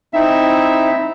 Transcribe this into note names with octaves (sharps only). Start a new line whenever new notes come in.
C4 D#4 E4 E5